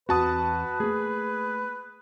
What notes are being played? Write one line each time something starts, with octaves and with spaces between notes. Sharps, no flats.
E2 C4 F#4 B4 A5 D#6
A3 A#3 G#4